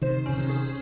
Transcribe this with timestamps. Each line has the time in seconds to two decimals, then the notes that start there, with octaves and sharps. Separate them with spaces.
0.02 C3 D#3 C5
0.26 C#3 C#4
0.37 C3 D#3
0.49 G#4